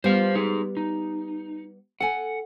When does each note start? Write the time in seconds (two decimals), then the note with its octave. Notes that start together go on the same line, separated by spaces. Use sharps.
0.04 G3 B3 C5 F5
0.35 D#4 G#4
0.77 D#4
2.01 A4 F#5 G#5